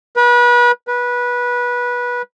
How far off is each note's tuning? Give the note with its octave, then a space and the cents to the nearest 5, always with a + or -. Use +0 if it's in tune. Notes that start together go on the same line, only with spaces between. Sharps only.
B4 -30
B4 -20